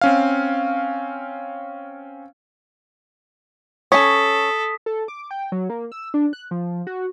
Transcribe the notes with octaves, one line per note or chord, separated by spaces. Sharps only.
C4 C#4 F5
C#4 A4 C#5 D#6 B6
A4
D6
G5
F#3
A#3
E6
D4
F#6
F3
F#4